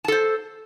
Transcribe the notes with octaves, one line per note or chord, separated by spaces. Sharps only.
A4 C5 A5